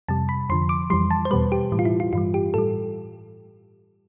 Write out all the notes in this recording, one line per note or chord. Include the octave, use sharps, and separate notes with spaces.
F2 C3 G3 A5
B5
F2 D3 F3 C6
D6
F2 E3 G3 C6
A5
C5
E2 B2 G3 B4
G4
A2 E3 G3
F4
E4
F4
G2 E3 G3 F4
G4
A2 G3 A4